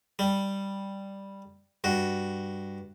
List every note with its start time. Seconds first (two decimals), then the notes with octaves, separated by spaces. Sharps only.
0.19 G3
1.84 G2 F#4